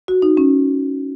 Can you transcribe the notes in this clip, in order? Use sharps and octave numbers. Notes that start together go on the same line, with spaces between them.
F#4
D#4
C#4